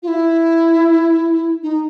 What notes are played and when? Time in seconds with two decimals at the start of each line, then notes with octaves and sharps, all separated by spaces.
0.03 F4
0.08 E4
1.63 D#4